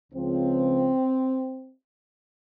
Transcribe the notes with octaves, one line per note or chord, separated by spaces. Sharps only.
C#2 C#3 F3 C4